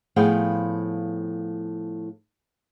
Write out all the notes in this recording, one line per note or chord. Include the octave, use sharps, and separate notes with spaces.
A2 F3 B3 G#4 F5 G5